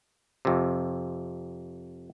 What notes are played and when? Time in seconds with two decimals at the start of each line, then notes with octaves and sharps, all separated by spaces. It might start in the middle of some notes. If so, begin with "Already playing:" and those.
0.45 F2 C3